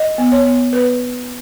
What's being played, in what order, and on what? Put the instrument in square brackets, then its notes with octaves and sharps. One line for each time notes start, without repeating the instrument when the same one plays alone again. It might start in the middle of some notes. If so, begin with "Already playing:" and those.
Already playing: [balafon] D#5
B3
C#5
B3
B3 B4